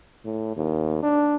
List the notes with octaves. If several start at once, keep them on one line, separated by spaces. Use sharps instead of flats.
A2
D#2
D4